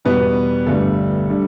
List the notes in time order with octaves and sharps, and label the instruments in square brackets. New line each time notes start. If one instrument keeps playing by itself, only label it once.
[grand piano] E2 B2 G3 B3 B4
G1 G2 D3 G3 A3 A4
D3 G3